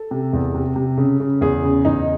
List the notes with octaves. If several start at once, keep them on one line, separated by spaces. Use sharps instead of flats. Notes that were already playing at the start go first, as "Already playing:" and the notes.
Already playing: A4
C3
E2
C3
C3
C#3
C#3
E2 G#4
C#3
E2 D#4